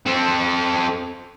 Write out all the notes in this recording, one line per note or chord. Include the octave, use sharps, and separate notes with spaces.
C4 A4